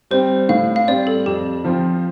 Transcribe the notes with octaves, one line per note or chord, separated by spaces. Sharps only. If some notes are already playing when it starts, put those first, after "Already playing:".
G3 C4 C5
A2 F5
F5
G3 C4 D5
A4
F2 G4
F3 C4 F4